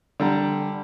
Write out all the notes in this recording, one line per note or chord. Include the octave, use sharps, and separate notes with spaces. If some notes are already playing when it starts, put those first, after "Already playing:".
D3 G3 A#5